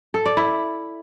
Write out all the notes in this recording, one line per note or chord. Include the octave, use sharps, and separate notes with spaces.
A4
D5
E4